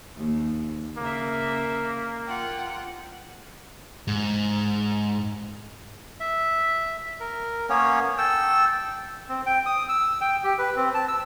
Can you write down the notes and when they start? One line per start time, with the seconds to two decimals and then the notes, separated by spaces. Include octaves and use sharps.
0.17 D#2
0.98 C#3 A#3 E5
2.26 F4 F#5 G5
4.08 G#2
6.20 E5
7.20 A#4
7.69 A#3 B3 C#4 C#5
8.18 A4 G5 E6
9.28 C4
9.46 G5
9.66 D#6
9.89 E6
10.21 G5
10.44 G4
10.58 B4
10.76 C4
10.94 A5
11.08 E6